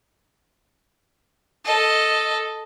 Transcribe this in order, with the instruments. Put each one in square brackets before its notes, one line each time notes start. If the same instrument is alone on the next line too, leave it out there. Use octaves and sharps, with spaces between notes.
[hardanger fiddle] A4 D#5